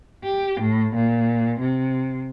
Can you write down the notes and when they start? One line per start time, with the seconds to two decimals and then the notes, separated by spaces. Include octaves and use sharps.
0.24 G4
0.60 A2
0.95 A#2
1.60 C3